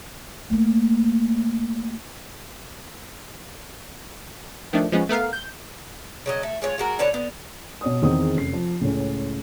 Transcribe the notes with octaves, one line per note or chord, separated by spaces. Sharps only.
A3 A#3
D#3 F3 A3 D4
F3 G#3 B3 C#4
A3 B3 A#4 F5
G6
C#3 F#3 D#5
A3
G#3 F4 C#5
G#3 F#4 A#4
D3 A4 B4 C#5
D3 B3
B2 C#5 D#6
E2 D#3 C4 G#4 D#6
F1 C#4 C7
F3
C#2 A2 C#4